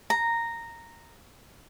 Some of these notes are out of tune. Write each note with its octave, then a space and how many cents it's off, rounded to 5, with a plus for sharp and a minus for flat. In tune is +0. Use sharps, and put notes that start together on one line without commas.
A#5 -10